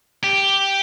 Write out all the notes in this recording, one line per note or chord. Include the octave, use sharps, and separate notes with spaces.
G4